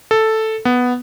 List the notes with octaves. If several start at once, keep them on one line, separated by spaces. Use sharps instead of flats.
A4
B3